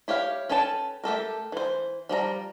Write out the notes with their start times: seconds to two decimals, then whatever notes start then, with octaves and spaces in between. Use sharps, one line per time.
0.08 E4 G4 C#5 F5
0.49 C#4 A4 B4 G5 A5
1.04 A3 G4 A4 A#4
1.52 E3 C5
2.09 F3 G3 G#4 A#5